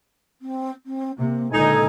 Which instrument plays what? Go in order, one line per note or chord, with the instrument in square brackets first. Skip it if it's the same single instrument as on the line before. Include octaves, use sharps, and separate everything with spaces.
[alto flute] C4
C4
[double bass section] C3 [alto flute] A#3
[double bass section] C#2 A#2 D3 [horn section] D#4 G#5 [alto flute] A4